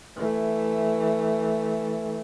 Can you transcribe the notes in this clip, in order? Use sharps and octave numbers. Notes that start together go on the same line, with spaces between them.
E3 A3